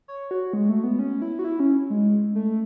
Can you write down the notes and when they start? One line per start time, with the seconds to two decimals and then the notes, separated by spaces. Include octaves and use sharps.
0.08 C#5
0.31 F#4
0.53 G#3
0.69 A3
0.84 B3
0.99 C#4
1.22 E4
1.39 F#4
1.44 E4
1.60 C#4
1.90 G#3
2.35 A3